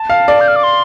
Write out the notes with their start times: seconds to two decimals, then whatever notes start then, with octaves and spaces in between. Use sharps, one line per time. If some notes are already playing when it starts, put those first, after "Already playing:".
Already playing: A5
0.10 F5
0.28 D5
0.41 G6
0.48 F6
0.56 D6
0.63 C6